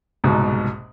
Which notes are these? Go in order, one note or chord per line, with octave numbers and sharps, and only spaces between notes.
F#1 C2 G#2 B2